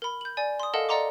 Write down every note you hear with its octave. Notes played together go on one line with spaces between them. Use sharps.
A#4 B5
G6 F#7
D5 G#5
C6 D#6
A4 A#4 D#5 F5 F#5 A5
D5 D#5 F#5 A#5 C6 D6